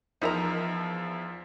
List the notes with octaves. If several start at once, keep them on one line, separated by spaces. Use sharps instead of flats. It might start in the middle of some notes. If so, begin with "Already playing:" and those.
E2 F3 D#4 A#4 E5 A#5